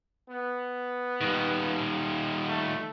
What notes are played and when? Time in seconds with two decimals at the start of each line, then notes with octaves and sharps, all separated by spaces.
0.29 B3
1.21 D#3 G3
2.48 A3